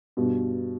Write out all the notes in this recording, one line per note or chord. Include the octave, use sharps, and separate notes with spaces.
G2 B2